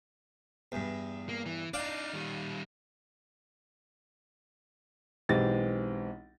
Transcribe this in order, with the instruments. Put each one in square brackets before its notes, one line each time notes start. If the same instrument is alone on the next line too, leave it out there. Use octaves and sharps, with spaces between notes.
[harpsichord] E2 G2
[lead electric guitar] A#3
E3
[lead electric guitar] D4 D#4 [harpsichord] D5 F5 G5
[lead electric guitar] D#3 G3
[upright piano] B1 E3 G#3 C4 G4 A6